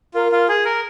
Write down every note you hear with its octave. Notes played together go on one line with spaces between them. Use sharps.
F4 A#4
F4
G#4
A#4